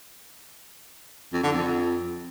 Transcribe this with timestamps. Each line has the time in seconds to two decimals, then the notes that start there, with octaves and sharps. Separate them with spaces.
1.33 F2
1.43 D3
1.53 F2